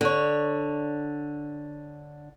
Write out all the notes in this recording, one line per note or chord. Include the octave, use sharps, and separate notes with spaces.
D3 C#5